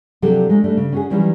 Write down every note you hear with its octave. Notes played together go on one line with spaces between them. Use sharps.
C3 F3 F#3 D4 G4 A4
G#3 A3
G3 A3 D4
C#3
C#4 F#4 G#4
D#3 E3 F#3 G3 C#4